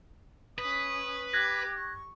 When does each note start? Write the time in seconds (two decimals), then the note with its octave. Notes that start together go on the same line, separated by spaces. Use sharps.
0.58 C#4 B4 D#6
1.33 G4 D6 F#6 G#6 A#6
1.77 C#6